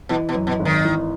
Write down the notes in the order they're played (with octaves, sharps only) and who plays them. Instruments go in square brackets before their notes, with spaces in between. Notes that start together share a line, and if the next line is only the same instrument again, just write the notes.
[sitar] B2 [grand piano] E3
[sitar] B2
[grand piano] F#2
[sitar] B2
[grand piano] G#1
[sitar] D#3
[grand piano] E3